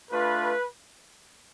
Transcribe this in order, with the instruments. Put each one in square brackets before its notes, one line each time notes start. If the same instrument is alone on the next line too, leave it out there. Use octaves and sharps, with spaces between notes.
[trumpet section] A3 D4 F4 B4